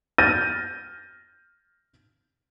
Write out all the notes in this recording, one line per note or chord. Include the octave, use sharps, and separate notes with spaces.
F6 G6 A6 A#6 D#7